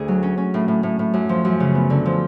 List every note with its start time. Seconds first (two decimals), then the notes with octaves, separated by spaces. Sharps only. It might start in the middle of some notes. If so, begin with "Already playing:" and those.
Already playing: D2 G#4
0.08 F#3
0.23 C#4
0.38 C#4
0.54 A2
0.68 A2
0.83 A2
0.99 A2
1.14 F#2
1.29 F3
1.45 F#2
1.60 C#3
1.75 B3
1.90 D3
2.05 F3